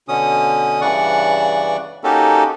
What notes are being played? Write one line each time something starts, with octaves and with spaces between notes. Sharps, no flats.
B2 D3 C#4 D#6
G2 C#3 E3 D5 F#5 C#6
A#3 C#4 D#4 F#4 G4 A4